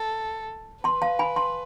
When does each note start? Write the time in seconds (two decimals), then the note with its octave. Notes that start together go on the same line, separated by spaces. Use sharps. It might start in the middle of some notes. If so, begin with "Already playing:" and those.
Already playing: A4
0.84 B4 A5 C6
1.02 F5 A5
1.19 G#5 B5
1.36 A5 C6